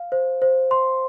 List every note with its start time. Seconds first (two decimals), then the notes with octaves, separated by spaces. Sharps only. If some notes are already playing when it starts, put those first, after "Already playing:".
Already playing: F5
0.12 C5
0.42 C5
0.71 C6